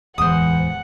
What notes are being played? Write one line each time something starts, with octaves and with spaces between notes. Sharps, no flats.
D1 E2 E3 G#3 C5 F#5 D#6